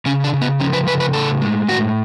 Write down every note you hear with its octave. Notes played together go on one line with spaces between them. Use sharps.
C#3 C#4
D4
C#3
B3
F3 C#4
B4
C#3 B4
B4
A2 A4
G#3
A2 F#4